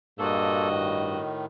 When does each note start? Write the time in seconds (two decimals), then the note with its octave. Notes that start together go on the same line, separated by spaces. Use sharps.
0.19 G2 A#2 A#3 F#4 A4 D#5
0.70 A2 D#3